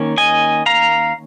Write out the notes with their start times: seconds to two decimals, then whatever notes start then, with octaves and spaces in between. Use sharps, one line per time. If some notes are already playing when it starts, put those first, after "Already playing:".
Already playing: D#3 A#3 C#4
0.18 D#5 G#5
0.66 F5 A#5